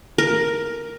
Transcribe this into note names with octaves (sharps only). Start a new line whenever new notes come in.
A#4